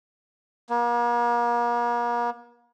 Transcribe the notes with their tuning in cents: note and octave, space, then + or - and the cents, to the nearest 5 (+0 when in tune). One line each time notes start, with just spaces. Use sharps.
A#3 +40